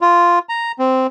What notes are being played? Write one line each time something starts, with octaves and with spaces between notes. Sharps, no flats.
F4
A#5
C4